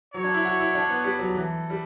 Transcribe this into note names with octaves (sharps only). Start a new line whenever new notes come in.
F#3 C#5
D4
E4
F#4
E4
D4
B3
G3
F#3
E3 A4
G3